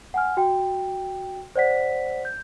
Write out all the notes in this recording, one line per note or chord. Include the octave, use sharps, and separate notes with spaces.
F#5 G#5 F6
F#4 G5
C5 D5 F#5 B6
G6